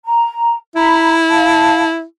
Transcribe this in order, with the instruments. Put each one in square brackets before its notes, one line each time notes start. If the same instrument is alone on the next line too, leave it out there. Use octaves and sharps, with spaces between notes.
[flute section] A#5
[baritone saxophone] E4 [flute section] A#5 B5
[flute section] F5 A5